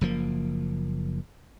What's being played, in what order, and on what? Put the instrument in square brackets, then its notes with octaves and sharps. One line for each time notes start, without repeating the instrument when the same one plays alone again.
[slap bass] F#1 F3 A#3